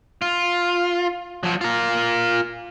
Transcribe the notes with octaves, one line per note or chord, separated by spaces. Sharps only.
F4
F3 F#3
F4 A#4